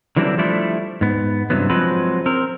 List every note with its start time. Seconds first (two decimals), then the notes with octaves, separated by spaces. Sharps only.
0.16 D3 E3 F#3 G3 C4 D4
0.38 F3 G3 A3 D4 E4
1.01 G#2 B3
1.50 G2 C3 E3 F#3 B3
1.70 F3 F#3 G#3 C4 B4
2.26 C4 A#4